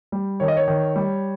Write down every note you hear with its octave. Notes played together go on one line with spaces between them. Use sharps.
G3
D#3 C#5
D#5
C#5
D#3
G3